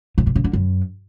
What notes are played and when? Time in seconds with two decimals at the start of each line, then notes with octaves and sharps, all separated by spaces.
0.18 A2
0.27 C3
0.36 C#3
0.44 D3
0.53 F#2